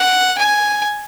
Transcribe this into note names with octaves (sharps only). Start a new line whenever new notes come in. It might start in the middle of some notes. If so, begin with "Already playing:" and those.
Already playing: F#5
G#5